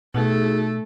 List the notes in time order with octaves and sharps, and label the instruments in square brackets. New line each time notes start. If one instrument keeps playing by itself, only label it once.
[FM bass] B2 [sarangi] A3 [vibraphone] D#4 F#4 G#4